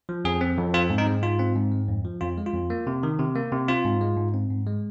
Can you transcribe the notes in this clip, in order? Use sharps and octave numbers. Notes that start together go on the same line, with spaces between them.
F3
F2 G#4
C4
F2
C4 F4
G#2
D#4
G#3
G#2 F4
C4
G#2
G#3
F2
F3
F2 F4
G#3
F4
F2
A#3
C3
D#3
C3
A#3
C3
C4 F4
G#2
G#3
G#2
C4
G#2
G#3